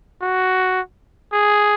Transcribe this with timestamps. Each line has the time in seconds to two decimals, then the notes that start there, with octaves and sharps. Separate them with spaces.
0.22 F#4
1.33 G#4